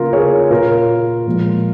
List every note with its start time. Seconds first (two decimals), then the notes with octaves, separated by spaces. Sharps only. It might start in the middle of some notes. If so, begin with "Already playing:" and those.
Already playing: C#3 A#3 F4 A#4
0.13 G#4 C#5
0.51 A#2 A#3 F4 A#4
1.27 A#2 F3 G#3